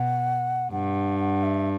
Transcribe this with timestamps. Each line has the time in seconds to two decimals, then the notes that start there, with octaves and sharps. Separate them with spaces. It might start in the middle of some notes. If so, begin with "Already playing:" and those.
Already playing: B2 F#5
0.72 G2 F#5
1.20 F#5
1.43 E5